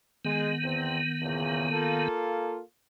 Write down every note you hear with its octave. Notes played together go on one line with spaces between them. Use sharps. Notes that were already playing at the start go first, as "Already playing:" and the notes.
D#3 G#3 B3
E2 C4
E2 A#2 C#3
A#3 F4 A4